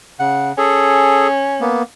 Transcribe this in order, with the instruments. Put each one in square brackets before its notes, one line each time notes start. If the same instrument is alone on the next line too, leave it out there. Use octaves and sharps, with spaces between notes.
[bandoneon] C#3 [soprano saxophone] F#5
[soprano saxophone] C#4 [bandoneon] G#4 A4
[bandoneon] A#3 B3